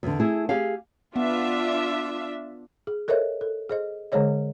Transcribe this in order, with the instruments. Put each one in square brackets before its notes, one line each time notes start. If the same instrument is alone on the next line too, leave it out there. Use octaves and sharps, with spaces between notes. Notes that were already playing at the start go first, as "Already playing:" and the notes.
[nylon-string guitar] E2 D3
A3 E4 G#4
G4 G#4 F5
[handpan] B3 [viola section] D4 F4 E5
[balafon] G#4
A4 A#4 C5 C#5 D#5 E5
A4
G#4 C5 D#5
D3 G#3 G#4 C5 C#5 D#5